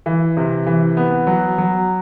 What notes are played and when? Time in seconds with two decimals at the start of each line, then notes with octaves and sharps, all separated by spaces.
0.06 E3
0.37 C3
0.67 E3
0.97 B3
1.27 F#3
1.58 F#3